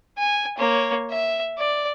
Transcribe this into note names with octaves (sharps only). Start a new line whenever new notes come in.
G#5
A#3 C#5
E5
D5